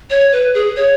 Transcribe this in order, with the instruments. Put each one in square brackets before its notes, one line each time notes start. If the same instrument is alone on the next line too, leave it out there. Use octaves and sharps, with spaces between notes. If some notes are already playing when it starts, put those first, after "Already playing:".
[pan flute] C#5
B4
G#4
C#5